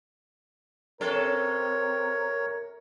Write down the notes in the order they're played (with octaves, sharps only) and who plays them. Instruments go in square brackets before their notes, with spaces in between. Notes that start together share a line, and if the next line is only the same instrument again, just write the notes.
[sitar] C3 C#4 A4 [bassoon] C4 [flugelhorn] A#4 [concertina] C#5